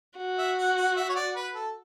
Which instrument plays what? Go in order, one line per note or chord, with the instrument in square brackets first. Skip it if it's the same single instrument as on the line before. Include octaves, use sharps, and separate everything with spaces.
[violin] F#4
[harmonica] E5
F#5
F#5
E5
C#5
D5
B4
A4